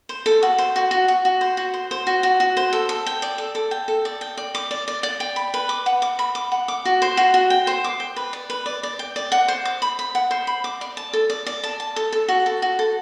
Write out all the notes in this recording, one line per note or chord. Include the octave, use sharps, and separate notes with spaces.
C5
A4
F#4
C5
F#4
F#4
F#4
F#4
C5
F#4
C5
C5
F#4
F#4
F#4
C5
A4
A4
G5
D5
A4
A4
G5
A4
D5
G5
D5
D6
D5
D5
D5
G5
B5
B4
D6
F#5
D6
B5
D6
F#5
D6
F#4
C5
F#4
F#4
G5
C5
D6
G5
B4
D5
B4
D5
D5
G5
D5
F#5
C5
D6
B5
B5
F#5
C5
B5
D6
D5
A5
A4
D5
D5
A5
A5
A4
A4
F#4
A4
F#4
A4